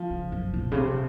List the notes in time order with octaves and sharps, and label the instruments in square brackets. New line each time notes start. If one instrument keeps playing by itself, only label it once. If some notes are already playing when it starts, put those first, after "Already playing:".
Already playing: [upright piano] F3
[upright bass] C#3
F#2
A#2
C#3
C3